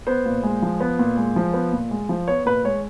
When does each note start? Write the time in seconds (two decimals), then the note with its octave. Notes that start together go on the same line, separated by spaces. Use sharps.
0.07 B3 C5
0.26 A#2
0.43 G#3
0.62 F3
0.81 B3
0.99 A#2
1.17 G#3
1.36 F3
1.54 B3
1.73 A#2
1.91 G#3
2.09 F3
2.28 B3 C#5
2.46 A#2 B4
2.64 G#3 C#5